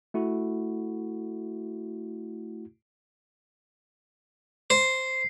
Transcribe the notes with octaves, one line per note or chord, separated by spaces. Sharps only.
A3 E4 F#4
C5 C7